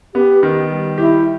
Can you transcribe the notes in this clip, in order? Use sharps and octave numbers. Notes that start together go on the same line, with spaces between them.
B3 G4
D#3
G3
E4 G4